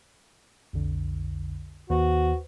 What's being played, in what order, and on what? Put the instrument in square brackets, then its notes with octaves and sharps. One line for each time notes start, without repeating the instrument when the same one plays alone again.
[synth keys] B1 F2 D3
[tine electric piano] D#2 [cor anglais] F#4 [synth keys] B4 C5